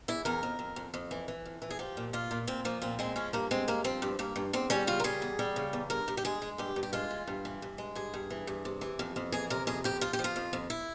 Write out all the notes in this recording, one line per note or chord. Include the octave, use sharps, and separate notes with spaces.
E2 E4
E2 A#4
F2
F2
F2
F2
E3
E3
F2
E3
G#4
F3 G4
A#2
A#2 F4
A#2
A#2 C4
F3 A#3
A#2 C4
G#3 C4
F3 C#4
G2 A#3
G#3 C4
G2 A#3
F3 C4
G2
G2 A#3
G2
E2 C4
G3 C#4
C#3 F4
A#4
G3 G#4
E2
G3
C#3
E2
G2 A#4
G2
G4
G#3 G#4
G#3
G2 G4
G2
G4
G#3 F4
E3
G2
E3
G2
G#3
G2 G#4
G2
E3
G2
C3
E3
F2
F2
E3 G#4
C3 A#4
F2 G#4
F2 G4
F2 F4
G4
F3
F4
F2
F2
E4